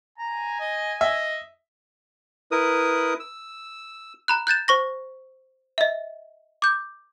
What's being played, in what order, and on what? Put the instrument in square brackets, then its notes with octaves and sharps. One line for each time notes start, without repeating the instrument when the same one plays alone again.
[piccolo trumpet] G#5 [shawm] A#5
[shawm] D#5
[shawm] D#5 [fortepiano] E5
[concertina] E4 A#4 B4 D#6
E6
[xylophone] A#5 B5 F#6
F#6 G6 A6 E7
C5 C#6 A#6
D#5 E5
D6 G6